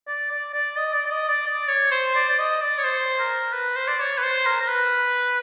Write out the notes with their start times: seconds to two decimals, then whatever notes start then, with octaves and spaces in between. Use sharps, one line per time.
0.07 D5
0.31 D5
0.54 D5
0.76 D#5
0.93 D5
1.06 D5
1.11 D#5
1.28 D5
1.46 D5
1.68 C#5
1.91 C5
2.15 D5
2.29 D5
2.39 D#5
2.61 D5
2.78 C#5
2.84 C5
3.19 A#4
3.53 B4
3.76 C5
3.88 D5
4.00 C#5
4.18 B4
4.23 C5
4.46 A#4
4.61 A#4
4.68 B4